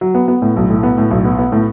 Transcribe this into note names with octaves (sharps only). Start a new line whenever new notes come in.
F#3
B3
B3
A2
B1
A2
B3
A2
B1
B3
B3
A2